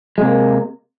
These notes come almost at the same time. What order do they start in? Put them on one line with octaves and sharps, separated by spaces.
G#3 C3 A#3